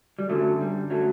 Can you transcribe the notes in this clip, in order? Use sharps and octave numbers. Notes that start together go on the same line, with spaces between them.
G3
F#2 D3 F#3 A3
G3
F#3 A3